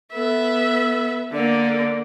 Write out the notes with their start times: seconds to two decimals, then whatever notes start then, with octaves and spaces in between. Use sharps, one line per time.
0.13 B3 A4 E5
1.32 D3 A#3 D5